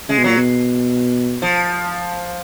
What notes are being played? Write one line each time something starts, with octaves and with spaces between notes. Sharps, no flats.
C#3 G#3
B2
A#2 F#3
B2
F3